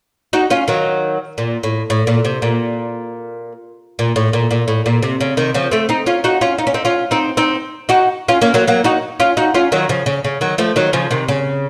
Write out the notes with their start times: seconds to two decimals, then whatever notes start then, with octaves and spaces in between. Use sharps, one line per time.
0.33 D#4 F#4
0.50 C#4 F4
0.68 D#3 F#3
1.38 A#2
1.63 A2
1.90 A2
2.07 A#2
2.25 C3
2.42 A#2
3.99 A#2
4.16 A2
4.33 A#2
4.51 A#2
4.68 A2
4.86 A#2
5.03 C3
5.21 C#3
5.37 C3 D#3
5.54 C#3 F3
5.72 A3 C4
5.89 C4 D#4
6.06 C#4 F4
6.24 D#4 F#4
6.41 C#4 F4
6.58 D#4
6.67 C#4
6.74 C4 D#4
6.85 C#4 F4
7.11 C4 D#4
7.37 C4 D#4
7.89 D#4 F#4
8.28 C#4 F4
8.42 A#3 C#4
8.54 F#3 A#3
8.67 F#3 A#3
8.84 D#4 F#4
9.20 C#4 F4
9.37 D#4 F#4
9.54 C#4 F4
9.72 D#3 F#3
9.89 C#3 F3
10.06 C#3
10.24 C#3
10.41 D#3 F#3
10.58 F3 A3
10.76 D#3 F#3
10.93 C#3 F3
11.11 C3 D#3
11.28 C#3